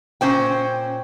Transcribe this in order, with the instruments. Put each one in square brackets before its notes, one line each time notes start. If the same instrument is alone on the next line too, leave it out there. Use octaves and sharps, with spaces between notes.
[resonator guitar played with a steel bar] A#2 C#4 C5 G5